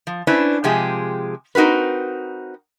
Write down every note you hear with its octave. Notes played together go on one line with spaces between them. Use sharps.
F3
C#4 D4 E4 B4 C5
C3 F3 G#3 G4 G#4
C4 D#4 F#4 A#4 B4